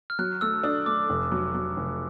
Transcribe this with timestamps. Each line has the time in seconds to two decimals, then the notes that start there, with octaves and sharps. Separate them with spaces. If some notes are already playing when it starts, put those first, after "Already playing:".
0.10 F6
0.19 F#3 F#6
0.41 A3 E6
0.64 D4 D#6
0.86 A3 D6
1.10 F1
1.32 F#3
1.54 F#3
1.77 F1